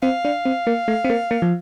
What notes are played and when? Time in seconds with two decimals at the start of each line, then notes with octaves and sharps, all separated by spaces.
0.03 C4 F5
0.25 D4
0.45 C4
0.67 A#3
0.88 A3
1.05 C4
1.10 A#3
1.31 A#3
1.42 F3